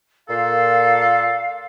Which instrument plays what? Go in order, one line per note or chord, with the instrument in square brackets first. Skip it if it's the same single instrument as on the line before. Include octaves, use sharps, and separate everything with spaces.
[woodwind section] A#2 A4 [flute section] F5